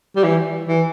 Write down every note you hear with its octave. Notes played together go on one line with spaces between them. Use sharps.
G3
E3
E3